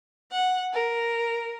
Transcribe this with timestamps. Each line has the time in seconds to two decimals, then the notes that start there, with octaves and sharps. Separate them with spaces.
0.31 F#5
0.73 A#4